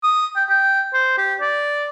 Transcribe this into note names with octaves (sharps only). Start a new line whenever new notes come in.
D#6
G5
G5
C5
G4
D5